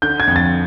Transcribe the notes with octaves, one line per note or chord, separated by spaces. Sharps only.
D3 G6
G#6
F2
A6